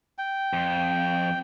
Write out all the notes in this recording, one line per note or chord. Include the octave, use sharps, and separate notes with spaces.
G5
F2